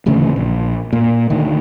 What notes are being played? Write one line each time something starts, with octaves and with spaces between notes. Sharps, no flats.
D1 A1 D2 C#3
A#1
A#2
D2 D#3